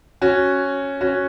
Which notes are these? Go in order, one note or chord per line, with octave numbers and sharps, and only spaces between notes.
C#4 F#4
C#4 F#4